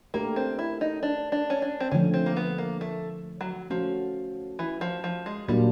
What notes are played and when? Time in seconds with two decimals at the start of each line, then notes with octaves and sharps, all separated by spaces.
0.14 A3 A#3 D4 G4 A#4
0.36 C4
0.59 E4
0.81 D#4
1.03 D4
1.32 D4
1.50 C#4
1.62 D4
1.80 C4
1.91 D3 F3 A3 C#4
2.14 C4
2.26 A#3
2.36 B3
2.58 A#3
2.81 A3
3.41 F#3
3.70 F3 A3 C#4 F#4
4.59 E3
4.81 F3
5.04 F3
5.26 G#3
5.48 A#2 F#3 G3 A#3 D4 F4